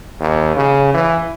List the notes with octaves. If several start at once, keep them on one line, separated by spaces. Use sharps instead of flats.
D#2
C#3
E3